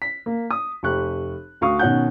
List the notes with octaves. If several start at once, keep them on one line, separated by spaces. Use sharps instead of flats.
B6
A#3
D#6
F1 G4 C#6 F#6
D2 F#4 F5 C#6 D#6
B2 D#3 C#4 F#5 F#6 G6